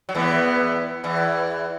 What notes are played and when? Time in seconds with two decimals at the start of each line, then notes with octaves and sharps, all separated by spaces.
0.09 F#3
0.15 E2 E3 B3
1.04 E2 E3